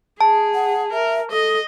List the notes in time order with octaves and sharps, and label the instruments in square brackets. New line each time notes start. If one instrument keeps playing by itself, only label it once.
[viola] G#4 [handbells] A5
[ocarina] F#5
[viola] A#4 [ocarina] E5
[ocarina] A4 [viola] D#5